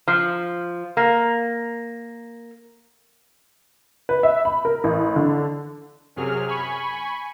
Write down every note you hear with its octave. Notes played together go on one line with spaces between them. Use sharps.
F3
A#3
B4
E5
B5
A#4
A1
D3
F#2 C3 F#3 G#4 F6
G#5 B5 C#6